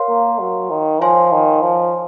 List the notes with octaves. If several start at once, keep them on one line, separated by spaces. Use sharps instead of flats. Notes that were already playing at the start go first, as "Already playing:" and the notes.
Already playing: A#4 C#5 F5 C6
A#3
F#3
D#3
F3 C#5 F5 G#5 C6
D#3
F3